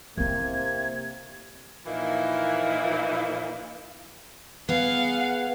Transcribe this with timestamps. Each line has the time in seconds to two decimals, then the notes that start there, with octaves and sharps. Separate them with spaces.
0.17 C3 A#3 C4 E4 G#6
1.86 A#2 E3 F3 A#3 D#4 E4
4.69 B3 G#4 F5 F#5